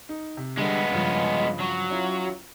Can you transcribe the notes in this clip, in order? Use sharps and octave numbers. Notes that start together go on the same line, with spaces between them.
D#4
C3
D3 G3 G#3 B3 A4
G2 C#3 F3
F#3
C#4 E4 F4